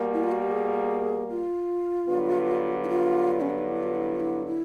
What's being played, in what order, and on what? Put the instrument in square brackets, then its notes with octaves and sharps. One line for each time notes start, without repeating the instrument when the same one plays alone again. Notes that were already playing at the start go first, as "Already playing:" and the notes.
Already playing: [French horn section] B2 G3 A#3
[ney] E4
F4
F#4
G4
G#4
F4
[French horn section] G2 D3 F#3 B3
[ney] E4
F4
C#4
D4
D#4
E4
F4
E4
F4
E4
E4